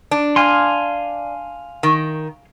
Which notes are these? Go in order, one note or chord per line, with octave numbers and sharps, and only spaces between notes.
D4
F5 G#5 C6
D#3